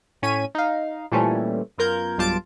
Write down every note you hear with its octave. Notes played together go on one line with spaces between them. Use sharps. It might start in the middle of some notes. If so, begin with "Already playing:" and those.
A2 C#4 C#5 G#6 B6 D#7
D#4 F5
A#2 E3 G3 A3 C4 C#4
F#2 B3 F4 A#4 G6 G#6
B1 G2 F4 G4 A5 D7